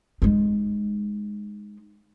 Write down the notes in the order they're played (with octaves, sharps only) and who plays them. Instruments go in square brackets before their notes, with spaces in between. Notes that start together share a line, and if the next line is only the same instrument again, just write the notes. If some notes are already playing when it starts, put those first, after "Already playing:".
[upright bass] G#3 D#4